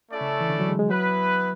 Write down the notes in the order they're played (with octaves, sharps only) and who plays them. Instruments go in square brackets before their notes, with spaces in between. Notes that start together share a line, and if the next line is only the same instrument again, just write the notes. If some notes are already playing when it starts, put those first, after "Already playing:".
[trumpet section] A3 C#4 E4 A4 D5
[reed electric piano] C#3
E3
D3
F#3
G#3
G#3
[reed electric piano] F#3 [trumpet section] B3 E4 B4